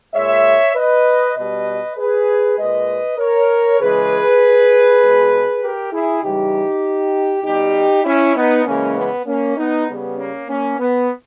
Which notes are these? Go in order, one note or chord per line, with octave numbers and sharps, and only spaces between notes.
A#2 G#3 C#5 E5
B4 D#5
B2 G3 B4 D#5
G#4 B4
A#2 G#3 B4 D#5
A#4 C#5
C#3 E3 G#3 G#4 B4
B2 G#3
G4 A#4
E4 G#4
C#3 E3 G3 D#4 G4
B2 G3 D#4 G4
C#4 E4
B3 D#4
C#3 E3 G#3 A#3 C#4
B3
A#3 C#4
B3 D#4
C#3 G3 B3
A#3 C#4
A#3 C#4
B3